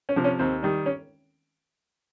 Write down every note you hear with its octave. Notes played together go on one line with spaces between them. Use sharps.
C#4
C3 F3
C#4
D#2 C4
D#3 G3
C#4